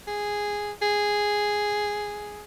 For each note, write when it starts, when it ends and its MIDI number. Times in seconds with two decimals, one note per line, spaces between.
0.07 0.72 68
0.82 2.44 68